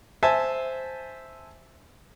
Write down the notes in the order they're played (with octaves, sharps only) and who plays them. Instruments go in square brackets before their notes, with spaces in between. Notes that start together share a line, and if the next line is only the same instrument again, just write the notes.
[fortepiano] C5 E5 G#5 A5